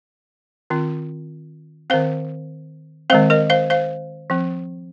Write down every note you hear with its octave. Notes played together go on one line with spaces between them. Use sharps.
D#3 C4 F4
D#3 C4 C5 F5
D#3 G#3 C4 C5 F5
A#4 D#5
C5 F5
C5 F5
F3 C4